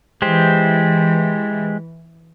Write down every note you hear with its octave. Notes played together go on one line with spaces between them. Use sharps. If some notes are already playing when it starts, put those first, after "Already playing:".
E3 G#3 G4 C5